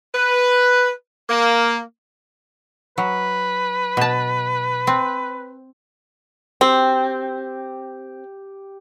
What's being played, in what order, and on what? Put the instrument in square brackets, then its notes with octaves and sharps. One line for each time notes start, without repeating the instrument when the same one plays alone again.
[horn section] B4
A#3
[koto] F#3 [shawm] B4
[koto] B2 A5
C4
[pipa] C4 [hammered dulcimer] G4